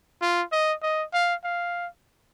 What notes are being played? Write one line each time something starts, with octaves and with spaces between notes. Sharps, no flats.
F4
D#5
D#5
F5
F5